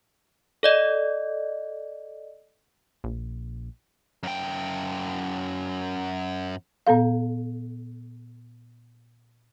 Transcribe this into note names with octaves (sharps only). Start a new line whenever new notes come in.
A4 D5 D#5
A#1
F#2 G5
A#2 B3 A4 F5